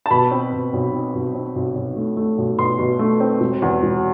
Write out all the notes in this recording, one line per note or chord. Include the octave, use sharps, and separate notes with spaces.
A5
B2 B5
C4
B2
B1
C4
B1
C4
B1
B1
A3
A3
B1
B2 C6
B2
A3
C4
E1
E2
E1